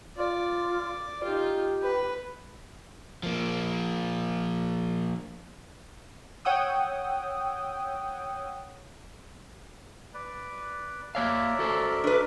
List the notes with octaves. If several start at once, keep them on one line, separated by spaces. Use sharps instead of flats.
F4 D5
D#4 F4 G4
B4
F3 A#3
C#5 F#5 G5 D#6 E6
B4 D5
A#3 A#4 C#5 D5 E5 F5
F#4 A4 C5
D4 B4